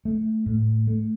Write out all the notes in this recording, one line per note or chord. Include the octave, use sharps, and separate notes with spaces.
A3
A2
A3